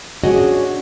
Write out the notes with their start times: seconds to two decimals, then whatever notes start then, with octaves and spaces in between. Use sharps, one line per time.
0.24 C#4 D4 F#4 G#4 D#5